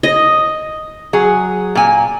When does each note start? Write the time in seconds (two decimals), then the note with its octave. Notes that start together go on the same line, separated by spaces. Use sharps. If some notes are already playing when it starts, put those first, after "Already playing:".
0.03 D#5
1.13 F#3 G#4
1.75 A#2 G#5